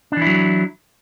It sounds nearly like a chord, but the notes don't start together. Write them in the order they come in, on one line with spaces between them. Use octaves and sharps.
D4 E3 E4 F#3